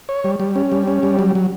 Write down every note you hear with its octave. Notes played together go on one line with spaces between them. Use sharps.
C#5
G3
G3
C#4
G3
C#4
G3
F#3
F#3